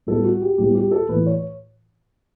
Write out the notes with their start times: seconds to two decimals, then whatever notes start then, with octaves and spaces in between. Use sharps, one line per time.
0.07 A2 G3 B3 A4
0.24 F#4
0.42 G4
0.58 A2 G3 B3 G4
0.75 G4
0.91 A4
1.09 A2 E3 A3 B4
1.26 C#5